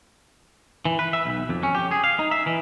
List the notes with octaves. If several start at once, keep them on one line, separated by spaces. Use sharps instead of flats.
E3
B4
E5
B1
F2
C#4
G4
G#4
F5
D#4
E5
E3